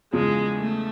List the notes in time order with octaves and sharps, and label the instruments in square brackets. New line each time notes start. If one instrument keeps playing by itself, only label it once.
[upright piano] E2 C#3 F3 [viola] G#3
[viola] A3